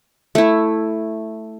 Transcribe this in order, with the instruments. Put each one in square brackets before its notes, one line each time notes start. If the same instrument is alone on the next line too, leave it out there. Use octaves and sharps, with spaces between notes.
[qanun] A3 E4